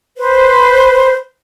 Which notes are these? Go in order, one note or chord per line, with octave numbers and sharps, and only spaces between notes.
B4 C5